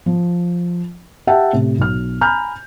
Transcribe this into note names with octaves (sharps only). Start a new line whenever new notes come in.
F3
G4 E5 F#5 G5 A5
A2 C3
B1 F6
G#5 A#5 B5 F6 G6